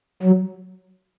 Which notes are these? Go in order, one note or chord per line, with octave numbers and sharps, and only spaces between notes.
F#3